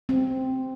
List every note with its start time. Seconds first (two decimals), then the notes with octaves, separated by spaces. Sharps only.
0.09 C4